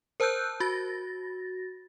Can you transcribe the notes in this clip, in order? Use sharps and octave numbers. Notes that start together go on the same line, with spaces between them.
A#4 C5 A5 E6 F#6 G6
F#4 A6 A#6